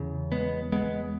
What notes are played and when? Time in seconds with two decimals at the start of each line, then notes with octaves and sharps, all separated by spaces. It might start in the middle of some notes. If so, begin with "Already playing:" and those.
Already playing: E2 C#3
0.32 G#3 B3
0.72 G#3 B3